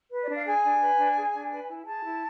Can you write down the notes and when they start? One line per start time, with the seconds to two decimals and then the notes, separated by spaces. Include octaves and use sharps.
0.11 B4
0.23 D5
0.29 D4
0.34 F5
0.46 G#4 G#5
0.63 D4
0.81 B4
0.98 D4
1.16 G#4
1.34 D4
1.50 B4
1.68 E4
1.85 G#4 A5
2.04 E4